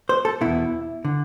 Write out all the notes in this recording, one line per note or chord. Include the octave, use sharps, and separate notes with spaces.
C5
A4
E2 B2 E4
D3